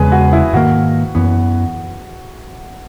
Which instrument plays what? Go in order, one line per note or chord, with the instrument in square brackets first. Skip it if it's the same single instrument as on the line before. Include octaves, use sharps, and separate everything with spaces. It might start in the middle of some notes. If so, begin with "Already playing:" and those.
Already playing: [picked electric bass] E2 C#3 G#3 [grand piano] G#4 B4
[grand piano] F#4
E4
[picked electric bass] G#2 D#3 A#3 [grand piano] F#4
[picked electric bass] F#2 E3 B3